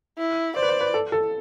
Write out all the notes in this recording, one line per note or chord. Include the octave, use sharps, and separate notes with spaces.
E4
C5 D5
B4
C5
B4
A4
A4